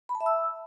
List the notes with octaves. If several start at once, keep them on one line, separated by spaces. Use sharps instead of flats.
B5
A5
E5
E6